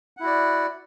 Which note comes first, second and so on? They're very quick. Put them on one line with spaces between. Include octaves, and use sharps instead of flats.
F#5 E4 F#4 D5